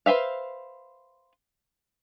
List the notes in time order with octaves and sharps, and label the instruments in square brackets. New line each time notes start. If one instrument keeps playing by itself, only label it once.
[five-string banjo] B4 C5 E5 F5